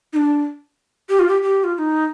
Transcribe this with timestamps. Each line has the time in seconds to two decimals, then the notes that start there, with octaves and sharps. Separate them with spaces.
0.13 D#4
0.16 D4
1.10 G4
1.19 F4
1.28 G4
1.42 G4
1.64 F4
1.75 F4
1.78 D#4